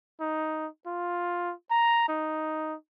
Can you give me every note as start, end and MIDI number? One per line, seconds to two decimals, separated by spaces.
0.21 0.68 63
0.87 1.53 65
1.71 2.08 82
2.08 2.75 63